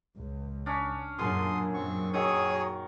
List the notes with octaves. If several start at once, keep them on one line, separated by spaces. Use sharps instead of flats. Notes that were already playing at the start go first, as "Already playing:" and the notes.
C#2
C#4 D4
F#2 A#2 D3 G#4 C6 D#6
C4 C#6
D#3 F#3 G#4 C#5 C#6 D#6
F#3